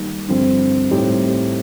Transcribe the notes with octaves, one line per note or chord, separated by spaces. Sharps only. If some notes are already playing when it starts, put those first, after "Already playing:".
Already playing: D#3 G3 A#3 D#4
G2 D3 F3 C4
A2 G3 C4 D#4 G4